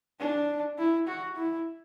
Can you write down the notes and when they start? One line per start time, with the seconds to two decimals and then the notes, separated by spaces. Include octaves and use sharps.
0.20 D4
0.78 E4
1.08 F#4
1.36 E4